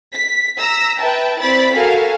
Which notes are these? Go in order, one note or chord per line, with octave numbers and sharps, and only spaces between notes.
B6
A#5 E6 A#6 B6
B4 E5 G5 A5
C4 E4 D5 B5 A6 B6
F#4 A4 A#4 F5 G#5